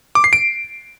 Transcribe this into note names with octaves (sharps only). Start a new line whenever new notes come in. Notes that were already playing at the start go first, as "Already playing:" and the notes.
D6
C7
D7